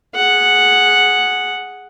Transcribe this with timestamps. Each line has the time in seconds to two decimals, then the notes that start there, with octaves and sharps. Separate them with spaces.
0.15 G#4 F#5